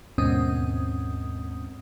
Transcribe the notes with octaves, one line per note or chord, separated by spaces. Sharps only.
D#2 G#2 B2 C4 C#4 D#6